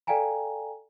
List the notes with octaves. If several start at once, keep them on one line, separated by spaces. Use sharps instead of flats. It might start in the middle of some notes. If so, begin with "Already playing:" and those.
A4 D5 F5 G5 G#5 A#5